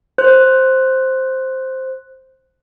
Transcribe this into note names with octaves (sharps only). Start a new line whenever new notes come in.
C5 F#6